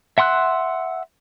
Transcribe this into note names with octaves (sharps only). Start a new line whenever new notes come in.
E5 F#5 C6 E6 F#6